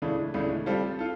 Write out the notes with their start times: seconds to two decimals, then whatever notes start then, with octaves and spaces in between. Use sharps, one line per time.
0.02 C#2 C#3 E3 A3 D4
0.34 C#2 C#3 E3 A3 D4
0.66 G3 C4 F4 A4
0.99 F4 A4